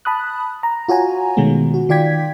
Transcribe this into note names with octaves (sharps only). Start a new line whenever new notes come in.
A5 B5 D#6 F#6
A#5
F4 F#4 C#5 G#5 A#5
B2 D#3 G#3 A3 B3
F#4
D#3 F4 D5 G5 G#6 B6